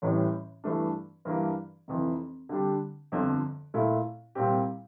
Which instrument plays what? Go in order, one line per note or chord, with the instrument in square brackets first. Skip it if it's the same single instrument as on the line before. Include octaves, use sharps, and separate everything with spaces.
[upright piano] A1 A2 E3 G3
G2 E3 A3 D4
G2 E3 A#3 D4
F1 F2 E3
D3 G3 D4 G4
G1 F2 D3 F3
A#2 A3 E4 A4
C2 A#2 G3 C4 G4